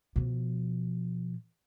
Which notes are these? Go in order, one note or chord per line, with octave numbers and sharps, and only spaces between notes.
B2 F3